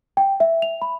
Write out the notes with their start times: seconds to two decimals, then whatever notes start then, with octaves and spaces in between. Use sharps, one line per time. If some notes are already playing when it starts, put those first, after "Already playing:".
0.17 G5
0.40 E5
0.62 F7
0.82 B5